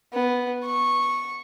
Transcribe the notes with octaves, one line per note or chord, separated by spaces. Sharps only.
B3
C#6